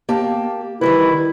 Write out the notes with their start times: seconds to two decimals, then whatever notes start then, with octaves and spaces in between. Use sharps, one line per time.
0.09 A#3 G4 A5
0.81 D#3 G3 E4 B4